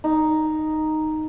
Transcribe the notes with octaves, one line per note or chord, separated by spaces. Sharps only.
D#4